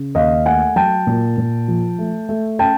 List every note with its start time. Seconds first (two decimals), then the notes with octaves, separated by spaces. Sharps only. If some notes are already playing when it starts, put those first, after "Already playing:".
Already playing: C#3
0.15 D#2 D#5 F5
0.46 A3 F#5 G#5
0.76 F#3 G5 A5
1.07 A#2
1.38 A#2
1.68 F3
1.99 A3
2.29 A3
2.59 C#4 G5 A5